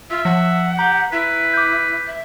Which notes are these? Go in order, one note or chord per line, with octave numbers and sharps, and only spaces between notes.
F4 E5
F3 F#5
G4 A#5
E4 B4
D6 G6
E5